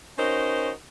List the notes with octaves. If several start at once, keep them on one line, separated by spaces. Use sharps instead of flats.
C#4 D#4 F#4 A#4 C5